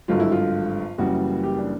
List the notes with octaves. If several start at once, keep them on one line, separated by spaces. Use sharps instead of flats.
G#1 G2 D3 F#3 F4
E4
F4
F#1 F#2 C#3 E3 G3 F#4
G4
D4